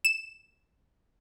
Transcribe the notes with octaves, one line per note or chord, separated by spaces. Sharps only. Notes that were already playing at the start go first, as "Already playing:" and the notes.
E7